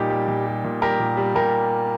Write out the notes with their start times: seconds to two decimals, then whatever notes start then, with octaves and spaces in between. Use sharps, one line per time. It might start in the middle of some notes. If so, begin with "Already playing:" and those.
Already playing: A#2 G3 D#4 G4
0.10 G3
0.28 A#2
0.46 G3
0.64 A#2
0.82 G3 G4 A#4
1.00 A#2
1.17 G3
1.35 A#2 G4 A#4